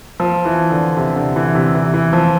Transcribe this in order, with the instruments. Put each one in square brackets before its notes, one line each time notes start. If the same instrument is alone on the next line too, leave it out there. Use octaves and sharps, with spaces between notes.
[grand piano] F3
E3
D3
C3
D3
E3
C3
E3
E3
F3